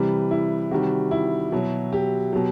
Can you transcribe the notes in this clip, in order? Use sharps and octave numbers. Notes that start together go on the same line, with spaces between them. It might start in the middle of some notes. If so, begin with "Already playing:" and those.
Already playing: C3 E3 G3 B4
E4
C3 D#3 G3 F#4
E4
B2 F#3
G4
B2 F#3